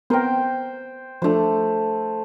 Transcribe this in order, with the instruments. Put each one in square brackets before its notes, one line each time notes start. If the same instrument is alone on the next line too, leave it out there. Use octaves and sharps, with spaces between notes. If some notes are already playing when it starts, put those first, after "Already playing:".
[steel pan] B3 C4 A#4 [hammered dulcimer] C5 G5
[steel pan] F3 D4 [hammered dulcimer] A3 C5